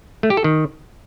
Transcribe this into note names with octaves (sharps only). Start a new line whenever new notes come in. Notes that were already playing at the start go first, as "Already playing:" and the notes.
A3
G4
A4
D#3